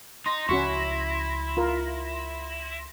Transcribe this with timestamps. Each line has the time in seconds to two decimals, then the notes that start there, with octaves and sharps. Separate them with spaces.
0.26 D#4 C6 A#6
0.49 C#2 F3 C#4 E4 F#4 C#6
1.57 F4 A#4